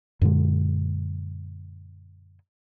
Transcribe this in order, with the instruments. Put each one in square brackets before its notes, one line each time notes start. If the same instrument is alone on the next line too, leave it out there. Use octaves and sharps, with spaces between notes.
[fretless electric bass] F#2 A#2 D3 G#3